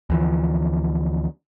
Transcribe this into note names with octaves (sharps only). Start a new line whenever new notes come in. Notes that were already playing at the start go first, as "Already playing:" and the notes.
D2 E3 F3